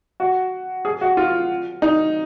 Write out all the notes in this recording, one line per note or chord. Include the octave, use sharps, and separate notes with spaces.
F#4
G#4
F#4
F4
D#4